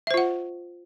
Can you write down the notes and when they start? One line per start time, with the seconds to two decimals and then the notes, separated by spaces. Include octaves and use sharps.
0.07 E5
0.11 C5
0.14 F4
0.17 F#5